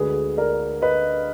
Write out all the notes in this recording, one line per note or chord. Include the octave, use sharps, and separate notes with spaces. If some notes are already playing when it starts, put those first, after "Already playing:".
Already playing: D2 D3 G#3 G#4 B4
A#4 D5
B4 D#5